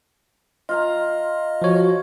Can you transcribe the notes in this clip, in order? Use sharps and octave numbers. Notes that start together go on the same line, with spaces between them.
F4 D#5 F5 A#5
F3 F#4 C#5